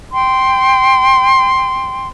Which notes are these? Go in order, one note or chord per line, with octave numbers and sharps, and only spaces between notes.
G5 C6